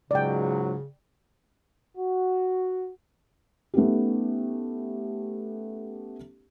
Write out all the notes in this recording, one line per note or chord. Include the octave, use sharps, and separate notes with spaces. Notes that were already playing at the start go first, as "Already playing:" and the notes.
C#2 G#2 C#3 F#3 D5 G5
F#4
A3 B3 C#4 D#4 G4